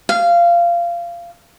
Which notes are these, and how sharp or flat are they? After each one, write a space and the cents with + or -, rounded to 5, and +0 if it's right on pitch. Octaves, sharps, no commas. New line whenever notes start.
F5 -20